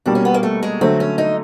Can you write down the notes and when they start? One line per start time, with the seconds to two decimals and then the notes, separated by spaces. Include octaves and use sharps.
0.06 B2 G3 A#3 D4
0.15 C#4
0.25 B3
0.34 A#3
0.43 A3
0.63 G#3
0.81 D3 F#3 A3 C4
1.00 C#4
1.18 D#4